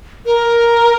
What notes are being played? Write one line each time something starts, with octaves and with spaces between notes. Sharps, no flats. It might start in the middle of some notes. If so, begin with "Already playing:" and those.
A#4